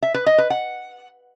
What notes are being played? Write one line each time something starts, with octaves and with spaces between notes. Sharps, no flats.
E5
B4
D#5
B4
F#5